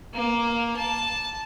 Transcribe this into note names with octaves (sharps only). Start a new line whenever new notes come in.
A#3
A5